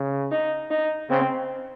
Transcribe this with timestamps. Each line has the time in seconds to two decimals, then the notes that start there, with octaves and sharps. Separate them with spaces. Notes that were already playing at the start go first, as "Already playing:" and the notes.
Already playing: C#3
0.31 D#4
0.70 D#4
1.10 C#3 C4